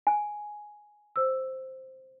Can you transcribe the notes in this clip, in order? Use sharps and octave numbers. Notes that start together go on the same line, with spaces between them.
G#5
C5 E6